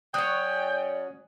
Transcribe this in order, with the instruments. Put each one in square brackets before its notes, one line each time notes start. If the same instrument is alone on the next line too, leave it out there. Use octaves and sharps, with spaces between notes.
[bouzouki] F#3 C#4 [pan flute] D5 [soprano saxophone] G5 [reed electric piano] D#6 F#6